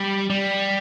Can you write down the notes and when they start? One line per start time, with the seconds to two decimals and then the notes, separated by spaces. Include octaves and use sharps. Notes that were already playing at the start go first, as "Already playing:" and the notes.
Already playing: G3
0.30 G3